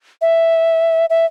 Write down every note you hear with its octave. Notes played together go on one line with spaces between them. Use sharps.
E5
E5